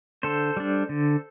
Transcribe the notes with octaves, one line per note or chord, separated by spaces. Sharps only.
D3 A4 C5
G3 D4
D3